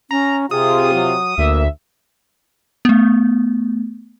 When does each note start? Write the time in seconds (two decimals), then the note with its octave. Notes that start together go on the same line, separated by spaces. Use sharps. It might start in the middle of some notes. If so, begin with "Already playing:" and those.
0.11 C#4 A#5
0.51 C3 F4 G#4 D#6
0.94 F#3
1.38 D2 A#3 E5
2.85 A3 B3